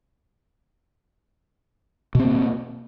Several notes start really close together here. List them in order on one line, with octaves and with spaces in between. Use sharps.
B2 C4 A#3